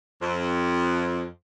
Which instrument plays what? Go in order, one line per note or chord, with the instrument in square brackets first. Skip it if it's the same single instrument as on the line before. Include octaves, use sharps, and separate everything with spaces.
[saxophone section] F2